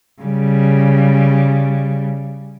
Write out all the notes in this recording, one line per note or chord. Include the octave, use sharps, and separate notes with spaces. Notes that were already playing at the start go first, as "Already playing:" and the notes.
C#3 G3